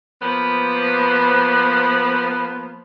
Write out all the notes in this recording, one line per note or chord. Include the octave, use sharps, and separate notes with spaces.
F3 A#3 B3 B4 C5